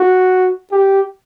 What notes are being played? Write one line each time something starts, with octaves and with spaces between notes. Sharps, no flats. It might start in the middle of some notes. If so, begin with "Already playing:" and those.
Already playing: F#4
G4